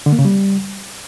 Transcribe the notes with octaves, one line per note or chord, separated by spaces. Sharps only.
D3
A#3
C#3
G3